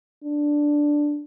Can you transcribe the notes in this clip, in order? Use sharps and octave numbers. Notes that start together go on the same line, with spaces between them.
D4